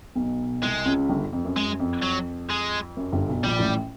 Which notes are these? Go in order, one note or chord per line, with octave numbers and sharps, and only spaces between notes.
B1 B2
C2 C3 G#3
C#2 C#3
G1 G2
F2
F#2
F#2 G#3
F2
F#3
G#3
F#2
G1 G2
B1 B2
A#1 A#2 G3
A1 A2